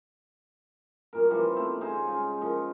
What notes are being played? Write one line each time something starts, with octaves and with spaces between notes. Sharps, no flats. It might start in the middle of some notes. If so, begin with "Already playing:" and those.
F#2 A#2 A#4
E3 F3 G3 A#3
A3 C4 D#4
C#3 D#4 C5 G#5
G#3 C#4 F4
A#2 F3 D#4 D#5